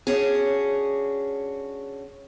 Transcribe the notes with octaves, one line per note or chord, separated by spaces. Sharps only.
C#4 D4 F#4 G#4